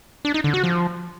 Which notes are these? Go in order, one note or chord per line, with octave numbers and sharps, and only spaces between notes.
D4
D#4
D3
F#4
F3